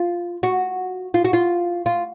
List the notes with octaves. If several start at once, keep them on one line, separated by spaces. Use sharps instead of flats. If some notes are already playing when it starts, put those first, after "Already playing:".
Already playing: F4
F#4
F4
F#4
F4
F4